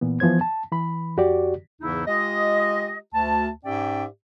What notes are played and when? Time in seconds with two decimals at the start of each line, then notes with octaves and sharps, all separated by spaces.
0.01 A#2 E3 B3
0.20 E3 F3 B3 C5 G#6
0.41 A5
0.72 E3 B5
1.17 F2 F#4 G4 D5
1.81 E2 G#2 C#3 E3 D#4 E4
2.07 G#3 F4 G4 D#5
3.13 D2 A5
3.65 G#2 C#4 G4 D5 E5 G5